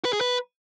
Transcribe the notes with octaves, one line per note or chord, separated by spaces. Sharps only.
B4
G#4
B4